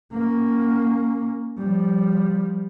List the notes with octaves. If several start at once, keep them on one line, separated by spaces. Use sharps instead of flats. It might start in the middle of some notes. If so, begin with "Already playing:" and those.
A#3 C#4
F3 G3